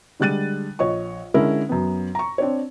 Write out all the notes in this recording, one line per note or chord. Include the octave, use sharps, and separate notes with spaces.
D3 G3 G#3 F#6 A6 D#7
A#1 C#5 D#5 C#6
D3 G#3 C#4 E4 A#4
F#2 B3
A#5 C#6
C4 D4 C#5